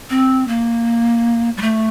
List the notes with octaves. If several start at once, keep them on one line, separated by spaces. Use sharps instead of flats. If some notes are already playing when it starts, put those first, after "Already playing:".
C4
A#3
G3
A3